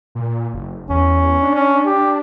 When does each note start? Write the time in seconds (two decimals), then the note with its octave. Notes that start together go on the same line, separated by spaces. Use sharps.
0.15 A#2
0.53 F#1
0.90 E2 C#4
1.42 D4
1.55 C#4
1.86 G4